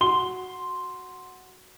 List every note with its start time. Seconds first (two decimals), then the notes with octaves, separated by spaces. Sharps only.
0.01 F#4 C6 G7